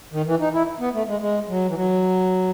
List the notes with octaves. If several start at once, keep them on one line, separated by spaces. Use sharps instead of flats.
D#3
E3
D#4
E4
B3
A3
G#3
G#3
F#3
E3
F#3